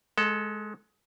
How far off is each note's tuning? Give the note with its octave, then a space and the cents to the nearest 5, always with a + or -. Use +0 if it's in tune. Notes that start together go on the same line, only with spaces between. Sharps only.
G#3 +20 A4 +0